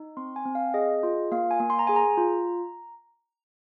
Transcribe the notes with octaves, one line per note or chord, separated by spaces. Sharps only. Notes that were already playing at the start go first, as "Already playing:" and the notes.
Already playing: D#4
C4 C6
G#5
C4
F5
G#4 D#5
F4
A#3 F5
G#5
A#3
C6
A#5
G#4 G#5
A#5
F4